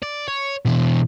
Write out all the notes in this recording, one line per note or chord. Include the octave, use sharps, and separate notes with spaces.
D5
C#5
B2 E3